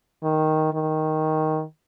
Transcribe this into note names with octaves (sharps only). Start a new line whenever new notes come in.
D#3
D#3